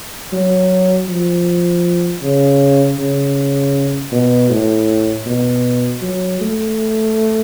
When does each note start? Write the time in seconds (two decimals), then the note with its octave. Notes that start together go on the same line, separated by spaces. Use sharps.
0.33 F#3
1.08 F3
2.23 C#3
2.98 C#3
4.12 B2
4.50 A2
5.26 B2
6.02 F#3
6.41 A3